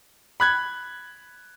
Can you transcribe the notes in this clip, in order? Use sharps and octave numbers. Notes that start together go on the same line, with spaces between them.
B5 F#6 G#6